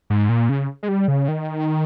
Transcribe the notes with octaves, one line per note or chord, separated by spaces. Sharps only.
G#2
A#2
C#3
G#3
G3
C#3
D#3